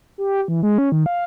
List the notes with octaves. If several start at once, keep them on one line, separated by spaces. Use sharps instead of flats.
G4
E3
G#3
C#4
D#3
F5